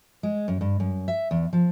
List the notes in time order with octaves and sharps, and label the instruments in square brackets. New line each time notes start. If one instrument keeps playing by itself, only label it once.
[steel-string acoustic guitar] G#3
F#2
G2
F#2
E5
E2
F3